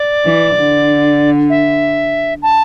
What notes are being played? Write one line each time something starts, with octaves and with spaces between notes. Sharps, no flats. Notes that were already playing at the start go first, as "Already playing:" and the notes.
Already playing: D5
E3
D3
E5
A5